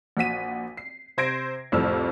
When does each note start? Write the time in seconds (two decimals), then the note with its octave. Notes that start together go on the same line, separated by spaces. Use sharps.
0.17 A#1 F#4 B6 D#7
0.77 C7
1.18 C3 C5 G#6 A#6 C7 D7
1.72 C2 F2 A2 E6 F6